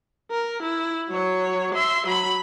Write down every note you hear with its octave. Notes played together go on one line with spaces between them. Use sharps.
A#4
E4
F#3 C#5
E5 C6
F#3 B5